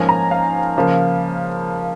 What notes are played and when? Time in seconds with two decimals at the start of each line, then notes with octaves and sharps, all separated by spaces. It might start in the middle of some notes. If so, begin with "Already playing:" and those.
Already playing: G#2 F3 A#3 C#4 G#5
0.09 A#5
0.31 F5
0.77 C#3 F3 A#3